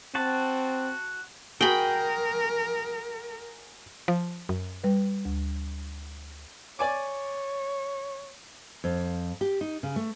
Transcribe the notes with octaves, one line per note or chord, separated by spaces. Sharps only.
C4 F#4 A5
F#4 G#4 A#4 G5 B5
F3
F#2
G3 B4
D2
C#5 D5 G#5 D6
F2
G4
D#4
C#3
A3